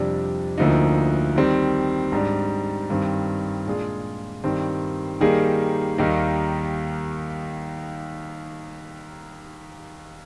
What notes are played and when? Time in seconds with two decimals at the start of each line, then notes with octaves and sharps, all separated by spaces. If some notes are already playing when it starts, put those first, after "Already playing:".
Already playing: F2 C3 G3 D4
0.58 D2 D3 F3 A#3 D#4
1.36 D#3 G3 C4
2.12 G#2 G3 D4
2.90 G2 D#3 G3 C4
3.67 A#2 G#3 D4 F4 G#4
4.44 G2 D#3 G3 C4
5.21 D#3 G3 A#3 D#4 G#4
5.98 D#2 D#3 G3 A#3 D#4